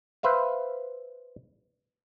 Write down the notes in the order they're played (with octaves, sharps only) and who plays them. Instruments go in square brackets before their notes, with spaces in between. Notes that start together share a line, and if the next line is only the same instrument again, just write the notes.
[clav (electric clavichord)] B4 C5 E5 F5